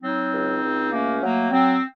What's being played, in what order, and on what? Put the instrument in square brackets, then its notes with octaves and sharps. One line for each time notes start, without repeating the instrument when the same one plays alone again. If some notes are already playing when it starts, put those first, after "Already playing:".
[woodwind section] F#3 C4 D#4
C#2
C#2
A3 A#3 C#4
F#3 A#3
F#3 C4